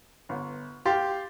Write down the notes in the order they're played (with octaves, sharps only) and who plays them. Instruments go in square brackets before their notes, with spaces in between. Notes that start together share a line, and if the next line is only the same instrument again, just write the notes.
[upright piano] G1 B3
[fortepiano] G4 [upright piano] F5 C6 A6